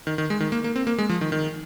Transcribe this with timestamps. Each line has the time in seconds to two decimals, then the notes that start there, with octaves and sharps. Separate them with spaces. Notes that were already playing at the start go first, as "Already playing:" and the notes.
0.07 D#3
0.18 D#3
0.30 G#3
0.40 D#3
0.52 A#3
0.64 A#3
0.76 C4
0.87 A#3
0.98 G#3
1.09 F3
1.21 D#3
1.32 D#3